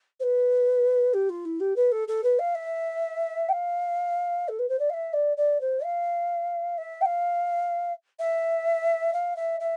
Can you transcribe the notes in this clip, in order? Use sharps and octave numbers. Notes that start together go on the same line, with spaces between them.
C5
B4
G4
F4
E4
G4
B4
A4
A4
B4
F5
E5
G5
F5
A4
B4
C5
D5
F5
E5
D5
D5
C5
F5
E5
G5
F5
E5
F5
E5
E5